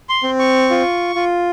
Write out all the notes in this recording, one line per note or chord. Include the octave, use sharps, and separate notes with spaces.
C6
C4
C#6
F4
F4